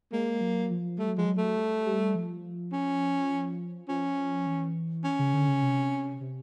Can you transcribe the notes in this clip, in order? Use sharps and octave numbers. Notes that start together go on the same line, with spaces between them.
G#3 A#3
F#3
F3
G3 A3
F#3
F3 G#3
F#3
A3
G3
G3
F3
C#4
F3 C#4
E3
C#4
C#3
D3
C#3
C3
C3